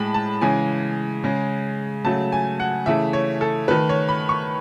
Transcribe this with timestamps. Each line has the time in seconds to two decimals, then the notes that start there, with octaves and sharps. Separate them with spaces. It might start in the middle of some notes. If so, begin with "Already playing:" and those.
Already playing: A2 G#3 A5 B5
0.14 A5
0.41 C#3 E3 G#3 G#5
1.24 C#3 G#3
2.04 C#3 F#3 A3 A5
2.32 G#5
2.60 F#5
2.86 C#3 E3 A3 E5
3.13 C#5
3.41 A4
3.68 D#3 A3 B4
3.89 C#5
4.09 B5
4.29 C#6